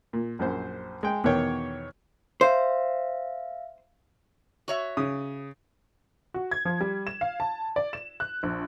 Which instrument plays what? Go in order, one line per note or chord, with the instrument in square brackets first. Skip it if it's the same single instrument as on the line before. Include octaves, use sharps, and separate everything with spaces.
[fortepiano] A#2
A#1 F#2 C5
G#3 G5
E2 B2 D#3 C#5 G5
[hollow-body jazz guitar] C5 [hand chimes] E5 F5
[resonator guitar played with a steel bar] F#4 C#5 E5
[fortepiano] C#3 D#6
[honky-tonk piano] F#4
G#6
F3
G3
E7
F5
A5
D5
E7
F#6
A#1